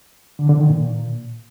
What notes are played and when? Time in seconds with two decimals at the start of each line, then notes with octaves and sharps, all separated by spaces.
0.39 D3
0.49 D3
0.59 D#3
0.70 A#2